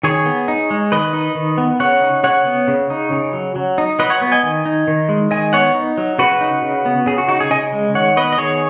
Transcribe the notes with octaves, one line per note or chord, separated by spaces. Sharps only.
D#3 G#4 C#5
B3
D#4
G#3
D#3 B4 D#5
D#4
D#3
B3
C#3 C#5 F#5
D#4
C#3 C#5 F#5
B3
C#3
D#4
C#3
F#3
F#3
D#4
F#3 B4 D#5
C#5 F#5
B3
D#5 G#5
D#3
D#4
D#3
G#3
D#3 D#5 G#5
B3 C#5 F#5
D#4
F#3
C#3 F#4 B4
D#4
C#3
B3
C#3 G#4
F#4
D#4 F#4
G#4
C#3 D#5 G#5
G#3
D#3 C#5 F#5
B3 B4 D#5
D#5
D#3 G#4 C#5